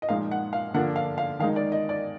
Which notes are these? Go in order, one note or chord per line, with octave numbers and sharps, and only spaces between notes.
D#5
A#2 F3 G#3 D#4 F5
F#5
F5
D3 F3 A#3 D4 F#5
F5
F5
D#3 G#3 D#4 F5
D5
D#5
D5